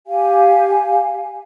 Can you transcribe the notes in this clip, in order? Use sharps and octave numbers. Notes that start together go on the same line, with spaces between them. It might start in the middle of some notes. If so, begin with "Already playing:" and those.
G4 F5 G#5